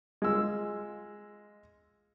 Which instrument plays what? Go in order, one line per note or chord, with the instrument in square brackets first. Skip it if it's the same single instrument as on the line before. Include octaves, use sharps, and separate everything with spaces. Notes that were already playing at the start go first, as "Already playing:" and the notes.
[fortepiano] G#3 F4 E6